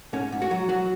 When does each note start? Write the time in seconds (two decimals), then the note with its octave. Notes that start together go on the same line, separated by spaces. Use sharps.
0.13 G#2 C#4
0.32 G#2
0.42 F#4
0.51 F#3
0.69 F#3 F#4